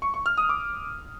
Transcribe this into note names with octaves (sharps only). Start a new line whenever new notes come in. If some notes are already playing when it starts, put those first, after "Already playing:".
C#6
C#6
F6
D#6
D6